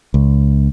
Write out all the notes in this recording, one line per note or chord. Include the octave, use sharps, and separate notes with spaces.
C#2